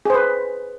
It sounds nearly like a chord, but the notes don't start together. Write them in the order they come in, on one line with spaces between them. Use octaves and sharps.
G#4 C5 B4